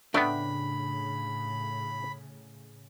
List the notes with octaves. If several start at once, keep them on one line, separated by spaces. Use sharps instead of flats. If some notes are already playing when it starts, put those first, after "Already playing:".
A2 C#3 A3 B3 D4 G5 B5